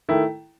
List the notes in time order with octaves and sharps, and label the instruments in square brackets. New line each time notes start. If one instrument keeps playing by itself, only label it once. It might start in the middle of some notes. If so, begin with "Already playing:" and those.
[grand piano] D#3 A3 E4